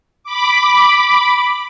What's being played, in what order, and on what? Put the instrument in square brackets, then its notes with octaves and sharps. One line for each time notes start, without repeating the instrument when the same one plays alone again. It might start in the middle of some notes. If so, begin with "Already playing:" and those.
[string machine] B5 D6